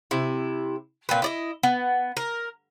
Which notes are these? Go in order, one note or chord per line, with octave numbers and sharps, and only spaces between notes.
C3 E4
A#2 C4 B4
E4 D5 D#5
B3
A#4